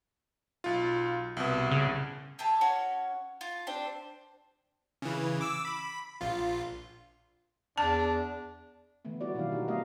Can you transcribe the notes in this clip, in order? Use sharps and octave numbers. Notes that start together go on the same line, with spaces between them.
B1 F4
C2 B2
C#3
G4 G#4 E5 A5
C#4 F#4 C#5
F4
C4 D4 G4 C5
C#3 E3
D6 E6
B5
A#1 F4
E2 D4 A5
D3 E3 A3 B3
G3 E4 F#4 D5
B2 D#3 F#3 A#3 D4 F5
B3 D#4 F#4 G4
F#3 A3 B3 A#4 D#5 F5